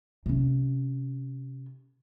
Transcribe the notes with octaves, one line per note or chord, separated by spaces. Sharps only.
C3 C#4